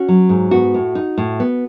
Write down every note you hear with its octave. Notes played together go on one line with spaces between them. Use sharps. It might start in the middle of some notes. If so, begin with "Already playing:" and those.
Already playing: C#4 F#4
F#3
G#2
B3 F#4
A2
D#4
A2
B3